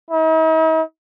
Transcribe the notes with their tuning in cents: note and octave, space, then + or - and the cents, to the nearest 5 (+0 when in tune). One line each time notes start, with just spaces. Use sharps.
D#4 +45